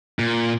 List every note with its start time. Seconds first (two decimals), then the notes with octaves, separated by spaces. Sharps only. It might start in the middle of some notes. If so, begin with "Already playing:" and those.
0.19 A#2